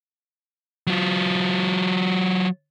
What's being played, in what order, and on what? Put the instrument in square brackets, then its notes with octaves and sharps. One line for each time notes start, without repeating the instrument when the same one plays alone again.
[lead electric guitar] F#3 F4